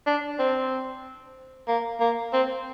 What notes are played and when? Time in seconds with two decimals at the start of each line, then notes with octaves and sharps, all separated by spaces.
0.06 D4
0.39 C4
1.68 A#3
2.00 A#3
2.33 C4